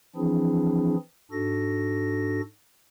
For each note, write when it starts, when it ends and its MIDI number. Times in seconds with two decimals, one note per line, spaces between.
0.16 0.95 52
0.16 0.95 53
0.16 0.95 60
0.16 0.95 62
0.16 0.95 64
0.16 0.95 68
1.32 2.41 44
1.32 2.41 62
1.32 2.41 66
1.32 2.41 69
1.32 2.41 94